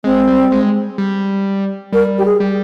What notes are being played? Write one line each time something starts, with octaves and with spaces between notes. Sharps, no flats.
G#3 C4
G3
G#3
G3
G3 A#4
G4
G#4
G3